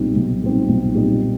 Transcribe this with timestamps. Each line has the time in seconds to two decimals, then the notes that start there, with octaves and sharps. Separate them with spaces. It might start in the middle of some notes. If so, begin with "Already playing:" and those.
Already playing: B1 A#2 G3 C4 D#4
0.16 B1
0.43 A#2 G3 C4 D#4
0.69 B1
0.95 A#2 G3 C4 D#4